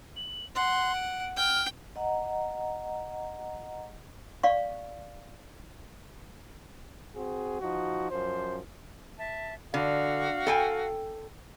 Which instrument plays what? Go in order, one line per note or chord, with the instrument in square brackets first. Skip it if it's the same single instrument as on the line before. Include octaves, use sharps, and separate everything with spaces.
[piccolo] F#7
[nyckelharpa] F#5 [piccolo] C6
[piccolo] D7
[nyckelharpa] G5 [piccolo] F6
[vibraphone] D#5 F#5 A#5
[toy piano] D5 F5 C#6
[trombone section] C4 F#4 G#4
F3 D#4 F#4
F#2 F3 C5
[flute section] E5 A5
[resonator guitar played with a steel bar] D3 [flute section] F#4 F5
[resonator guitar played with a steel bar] A4 G5 G#5